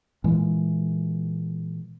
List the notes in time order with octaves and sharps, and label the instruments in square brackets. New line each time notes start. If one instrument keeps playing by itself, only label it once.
[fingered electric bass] A#2 E3 G#3